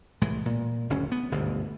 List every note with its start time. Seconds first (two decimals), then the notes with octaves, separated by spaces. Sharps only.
0.21 C2 A2 E3 G#3
0.46 A#2
0.90 F#1 D2 C#4
1.12 B3
1.32 G1 D2 G#2 B2